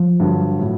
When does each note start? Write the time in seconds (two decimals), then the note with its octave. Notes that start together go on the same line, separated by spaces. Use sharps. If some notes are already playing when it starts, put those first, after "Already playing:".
Already playing: F3
0.20 G2 D3 F#3
0.59 A2 F#3